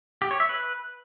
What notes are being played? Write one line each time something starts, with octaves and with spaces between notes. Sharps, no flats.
G4
C#5
E5
B4